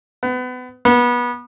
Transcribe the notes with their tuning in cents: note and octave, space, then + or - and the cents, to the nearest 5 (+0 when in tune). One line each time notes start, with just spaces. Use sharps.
B3 +30
B3 -25